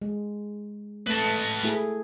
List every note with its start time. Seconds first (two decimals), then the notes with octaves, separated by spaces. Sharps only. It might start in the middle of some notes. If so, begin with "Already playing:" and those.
0.02 G#3
1.07 A3 B4 A5
1.63 A3 E4 G#4